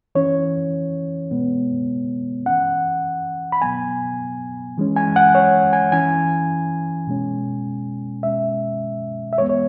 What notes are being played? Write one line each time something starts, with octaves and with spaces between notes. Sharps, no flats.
E3 C#4 C#5
B2 G#3 B3
E3 C#4 F#5
B5
B2 F#3 B3 G#5
E3 G#3 C#4
G#5
F#5
C#5
G#5
E3 C#4 G#5
B2 G#3 C#4
B2 G#3 C#4 E5
E5
E3 G#3 B3 C#5
C#5